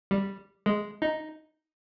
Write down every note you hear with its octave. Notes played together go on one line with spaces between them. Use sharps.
G3
G#3
D#4